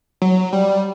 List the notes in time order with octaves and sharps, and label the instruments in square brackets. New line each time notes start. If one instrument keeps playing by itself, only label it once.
[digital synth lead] F#3
G3